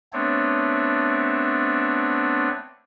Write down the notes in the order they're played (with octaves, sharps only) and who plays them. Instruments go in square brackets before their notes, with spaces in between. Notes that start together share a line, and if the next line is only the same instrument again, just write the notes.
[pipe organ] A3 B3 C4 D4 C#5